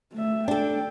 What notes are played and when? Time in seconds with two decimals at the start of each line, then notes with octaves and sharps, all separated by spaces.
0.13 A3 E5
0.48 D4 A4 G5